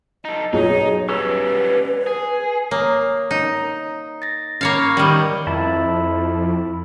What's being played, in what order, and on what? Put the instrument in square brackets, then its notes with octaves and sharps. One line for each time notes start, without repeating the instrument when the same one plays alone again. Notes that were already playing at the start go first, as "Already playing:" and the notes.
[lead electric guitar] D#4 A4 [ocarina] D#5
[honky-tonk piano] B1 G#4 D#6 [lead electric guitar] D#4 [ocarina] C#5
[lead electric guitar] G3 C#4 [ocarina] B4 [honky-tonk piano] E6
[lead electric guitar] G#4
[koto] A#3 [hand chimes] C#5 A#5 D#6
[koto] D#4
[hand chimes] A6 A#6
[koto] A#3 C#5 F5 [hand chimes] C#4 B5
[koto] D#3 G3
[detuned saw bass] F2 [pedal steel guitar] E4 A5